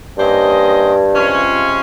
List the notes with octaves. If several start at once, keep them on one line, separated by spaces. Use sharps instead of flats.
G2 A#3 C#4 G4 C5 D#5
C3 F3 G#3 C#4 F4